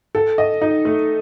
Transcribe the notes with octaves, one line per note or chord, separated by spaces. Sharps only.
A4
D#5
D#4
A3